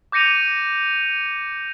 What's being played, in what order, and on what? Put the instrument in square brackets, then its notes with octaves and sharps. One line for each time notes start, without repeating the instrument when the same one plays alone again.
[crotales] D6 G6 A#6 C#7 D#7 F7